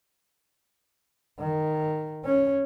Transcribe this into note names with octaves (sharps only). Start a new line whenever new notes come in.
D#3
C#4